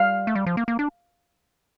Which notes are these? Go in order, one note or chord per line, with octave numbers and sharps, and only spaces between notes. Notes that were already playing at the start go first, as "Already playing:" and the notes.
Already playing: G3 F5
A3
G3
F3
A#3
A#3
D4